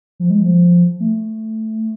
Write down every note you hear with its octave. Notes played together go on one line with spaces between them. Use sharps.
F3
G#3
F3
A3